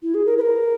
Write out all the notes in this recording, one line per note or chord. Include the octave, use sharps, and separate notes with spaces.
E4
G#4
A#4
B4
A#4